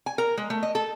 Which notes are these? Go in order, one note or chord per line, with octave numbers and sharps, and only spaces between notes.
G#5
A#4
G#3
A3
D#5
A4